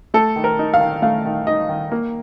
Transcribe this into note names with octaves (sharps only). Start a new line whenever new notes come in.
A3 A4
D#3
A#4
D#4
F5
D#3
A3 F5
D#3
D#4 D#5
D#3
A#3